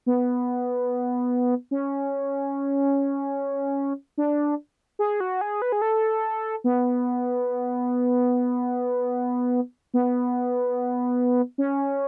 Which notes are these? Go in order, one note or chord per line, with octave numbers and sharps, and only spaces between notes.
B3
C#4
D4
G#4
F#4
G#4
B4
G#4
A4
B3
B3
C#4